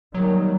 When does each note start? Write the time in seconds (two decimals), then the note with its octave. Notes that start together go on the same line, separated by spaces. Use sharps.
0.14 D#3 F#3 G3 A#3